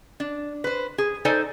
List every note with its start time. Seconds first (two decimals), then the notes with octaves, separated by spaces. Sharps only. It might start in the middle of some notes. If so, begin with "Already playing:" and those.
0.20 D4
0.64 B4 C5
0.98 G#4
1.25 D#4 A4 C5 D5 G#5